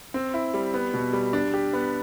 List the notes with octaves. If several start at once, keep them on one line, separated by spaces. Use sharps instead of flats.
C4
E4
G3
B3
B2
G3
D4
G4
B3